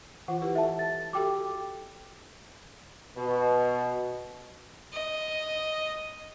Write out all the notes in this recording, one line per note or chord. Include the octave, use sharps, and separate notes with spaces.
E3 F4 F#5
E4 G4 B4
A4 E5 A5
A6
F#4 G4 A4 G5 D6
B2
D#5